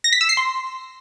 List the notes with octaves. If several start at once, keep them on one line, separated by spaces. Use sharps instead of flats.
A#6
B6
E6
C7
C6